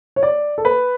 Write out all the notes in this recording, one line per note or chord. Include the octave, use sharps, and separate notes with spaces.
C#5
D5
A4
B4